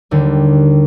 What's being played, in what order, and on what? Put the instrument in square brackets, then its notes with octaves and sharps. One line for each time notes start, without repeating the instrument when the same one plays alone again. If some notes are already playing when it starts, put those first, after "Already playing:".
[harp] D#2 D3 G3